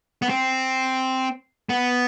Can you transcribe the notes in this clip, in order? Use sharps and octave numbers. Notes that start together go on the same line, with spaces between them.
B3
C4
B3